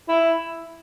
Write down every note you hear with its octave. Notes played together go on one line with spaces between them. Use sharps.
E4